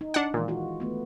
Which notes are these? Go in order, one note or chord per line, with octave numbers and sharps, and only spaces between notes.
D#4
D4 F#5
A#2 D#3 E3 G#3
F4 F#4
A3 B3